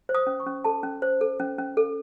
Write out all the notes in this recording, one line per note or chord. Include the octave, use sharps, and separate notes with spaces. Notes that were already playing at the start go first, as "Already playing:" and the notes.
C5
D#6
C#4
C#6
C#4
A4 A5
C#4
C5
A4
C#4
C#4
A4